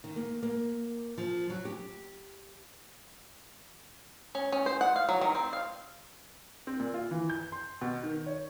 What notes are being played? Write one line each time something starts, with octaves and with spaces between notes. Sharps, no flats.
D#3
A#3
A#3
F3
F#3
G4
C#4
C#4
C5
F#5
F5
F#3
D#3
C4
F5
C4
A#2
F4
E3
G6
C6
B2
D#3
C#5